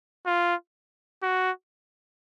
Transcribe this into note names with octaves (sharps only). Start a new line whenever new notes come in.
F4
F#4